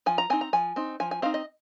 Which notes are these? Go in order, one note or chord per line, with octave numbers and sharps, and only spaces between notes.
F3 G#5
A#5
C4 D#4 G#5
A#5
F3 G#5
C4 D#4
F3 G#5
G#5
C4 D#4 F5
D#5